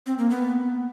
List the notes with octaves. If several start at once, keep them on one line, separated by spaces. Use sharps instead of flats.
C4
A#3
B3